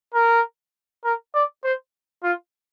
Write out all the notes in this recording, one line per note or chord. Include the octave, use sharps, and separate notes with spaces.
A#4
A#4
D5
C5
F4